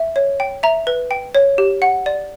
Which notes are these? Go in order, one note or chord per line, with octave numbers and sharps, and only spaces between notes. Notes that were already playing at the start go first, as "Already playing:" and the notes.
Already playing: E5
C#5
G5
E5 A#5
B4
G5
C#5
G4
F#5
D5